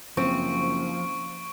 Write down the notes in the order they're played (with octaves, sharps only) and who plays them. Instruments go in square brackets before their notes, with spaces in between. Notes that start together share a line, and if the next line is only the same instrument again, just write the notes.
[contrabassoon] F#1 [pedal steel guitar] F3 [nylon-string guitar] C4 [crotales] C#6 D7